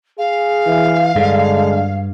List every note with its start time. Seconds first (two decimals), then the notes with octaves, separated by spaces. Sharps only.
0.18 G#4 F5
0.67 E3
1.15 G2 D3 G#3